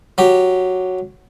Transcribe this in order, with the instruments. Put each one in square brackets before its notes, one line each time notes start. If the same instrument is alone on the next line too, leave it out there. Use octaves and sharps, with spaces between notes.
[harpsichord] F#3 G4